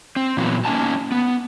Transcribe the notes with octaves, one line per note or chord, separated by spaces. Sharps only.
C4
A#2 E3 F#3 B3
A#3 C#4 D#4 G#5 A5
B3